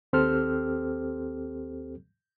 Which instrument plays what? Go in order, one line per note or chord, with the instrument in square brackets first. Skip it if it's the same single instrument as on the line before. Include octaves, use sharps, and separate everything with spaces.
[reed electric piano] D#2 C4 G4 A4 C5 F6